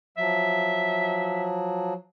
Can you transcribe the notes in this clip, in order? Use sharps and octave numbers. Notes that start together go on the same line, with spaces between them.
F3 F#3 E5